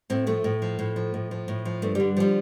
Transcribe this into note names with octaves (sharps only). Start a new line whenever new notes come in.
A2 C4
F3 A3
A2
F3
A2
F3
A2
F3
A2
F3
G2 A3
D3 G3
F3 G3